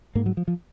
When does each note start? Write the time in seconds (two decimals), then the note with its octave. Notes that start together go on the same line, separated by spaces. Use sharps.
0.15 G#2 A#3
0.26 F#3
0.37 F3
0.48 F3